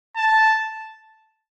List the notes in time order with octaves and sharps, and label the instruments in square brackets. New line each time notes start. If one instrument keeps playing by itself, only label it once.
[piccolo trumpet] A5